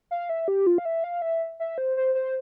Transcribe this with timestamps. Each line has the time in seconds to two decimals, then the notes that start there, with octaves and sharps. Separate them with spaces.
0.11 F5
0.29 E5
0.48 G4
0.67 F4
0.78 F5
0.85 E5
1.04 F5
1.22 E5
1.60 E5
1.78 C5
1.97 C5
2.15 C5